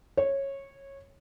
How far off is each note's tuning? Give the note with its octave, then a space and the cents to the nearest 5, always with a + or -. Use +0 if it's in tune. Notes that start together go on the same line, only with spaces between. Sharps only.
C#5 -15